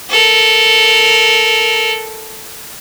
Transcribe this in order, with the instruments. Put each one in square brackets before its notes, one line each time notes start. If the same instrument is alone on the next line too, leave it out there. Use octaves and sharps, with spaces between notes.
[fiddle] A4 A#4